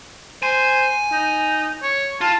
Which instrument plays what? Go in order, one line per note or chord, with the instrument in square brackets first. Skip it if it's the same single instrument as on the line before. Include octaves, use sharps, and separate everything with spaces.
[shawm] C5 [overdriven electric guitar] G#5
[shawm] D#4
C#5
[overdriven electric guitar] F4 [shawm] A5